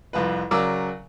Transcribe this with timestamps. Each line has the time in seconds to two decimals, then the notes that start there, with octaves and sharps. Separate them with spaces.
0.13 C2 F2 F4 B4
0.51 C#3 F#3 A#4 D5 D6 E6